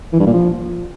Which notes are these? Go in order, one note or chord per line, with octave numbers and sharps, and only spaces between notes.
E3
G2
A#2
F3